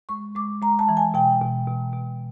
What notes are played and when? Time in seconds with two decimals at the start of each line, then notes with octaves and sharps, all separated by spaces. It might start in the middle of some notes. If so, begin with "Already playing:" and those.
0.09 G#3 C#6
0.35 G#3 D6
0.62 G#3 A#5
0.79 A5
0.89 E3
0.97 G#5
1.14 B2 G5
1.41 B2
1.67 B2
1.93 B2